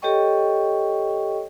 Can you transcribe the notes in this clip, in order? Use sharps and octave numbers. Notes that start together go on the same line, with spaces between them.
G4 A4 C#5 D#5 G5 C#6